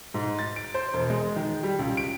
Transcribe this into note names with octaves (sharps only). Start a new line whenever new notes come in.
G#2
A6
D7
C5
E1
G#3
D#3
G3
C#2
D7